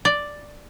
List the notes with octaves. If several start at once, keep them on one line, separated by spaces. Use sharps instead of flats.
D5